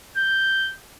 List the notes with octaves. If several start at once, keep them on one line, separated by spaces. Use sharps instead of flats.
G6